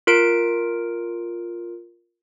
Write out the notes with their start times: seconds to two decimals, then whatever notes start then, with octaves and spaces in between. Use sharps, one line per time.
0.07 F4 A#4 D7